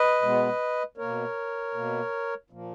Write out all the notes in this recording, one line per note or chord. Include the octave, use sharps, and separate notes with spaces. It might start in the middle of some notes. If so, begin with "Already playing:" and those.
Already playing: B4 D#5
B2 G#3 B3
B2 A#3 A#4 C#5
B2 A#3
A#2 F3 A#3